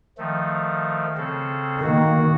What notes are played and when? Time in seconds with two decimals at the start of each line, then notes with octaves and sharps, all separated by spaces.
0.18 D#3 F3 A3
1.17 C#3 C4 A4
1.81 D#3 A#3 F#4